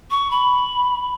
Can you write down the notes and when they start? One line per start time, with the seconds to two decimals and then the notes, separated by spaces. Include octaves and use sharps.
0.11 C#6
0.31 B5